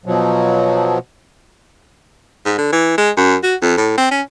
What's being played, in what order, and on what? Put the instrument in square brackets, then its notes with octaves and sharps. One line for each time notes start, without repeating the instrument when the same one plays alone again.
[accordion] B2 F3 F#3
[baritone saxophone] G#2
D3
E3
G#3
F#2
F#4
F2
A2
C4
C#4